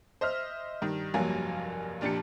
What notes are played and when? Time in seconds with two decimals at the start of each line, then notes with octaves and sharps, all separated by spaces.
0.21 C5 D#5 E5 F6
0.82 G2 D#3
1.14 F1 G2 F#3 A#3 G#5
2.01 F1 A#2 D4 G4 A5 C#7